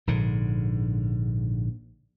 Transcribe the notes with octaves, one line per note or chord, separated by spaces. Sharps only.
A#1 G#2 D3